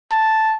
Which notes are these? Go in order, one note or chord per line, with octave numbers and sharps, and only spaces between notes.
A5